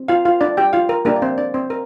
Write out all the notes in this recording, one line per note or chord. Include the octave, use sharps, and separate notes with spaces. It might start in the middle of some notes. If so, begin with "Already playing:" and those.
Already playing: C4
F4 F5
F4 F5
D4 D5
G4 G5
F4 F5
A#4
A#3 D4 G4 A#4
D5
C4 C5
D4 D5
C4 C5
A#4